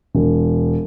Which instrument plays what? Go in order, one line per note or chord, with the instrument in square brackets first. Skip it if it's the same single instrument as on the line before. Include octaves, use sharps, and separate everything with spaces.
[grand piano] E1